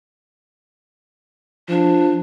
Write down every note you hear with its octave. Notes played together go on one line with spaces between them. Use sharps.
F3 D4